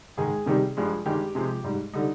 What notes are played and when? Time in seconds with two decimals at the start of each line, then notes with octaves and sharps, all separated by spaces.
0.17 G#2 D#3 G#3 G#4
0.46 C3 D#3 G3
0.77 G2 F3 G#3
1.06 G2 D#3 G#3 G4
1.35 C3 F3 G#3
1.64 G#2 G3
1.94 D3 G3 D#4